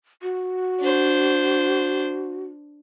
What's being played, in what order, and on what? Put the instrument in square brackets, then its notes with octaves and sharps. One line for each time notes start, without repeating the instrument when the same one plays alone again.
[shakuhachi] F#4
[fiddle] D4 C5